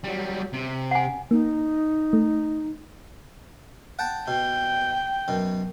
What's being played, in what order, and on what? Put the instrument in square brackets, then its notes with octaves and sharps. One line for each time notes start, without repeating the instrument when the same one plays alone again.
[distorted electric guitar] F#3 G3
C3
[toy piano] F#5 G#5
[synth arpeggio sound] A#3 [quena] D#4
[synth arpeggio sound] A3
[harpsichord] F#5 G5 A5
[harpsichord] B2 [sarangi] G5
[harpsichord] F#2 B2